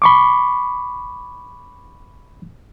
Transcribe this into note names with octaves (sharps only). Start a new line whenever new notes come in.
B5 C#6 D6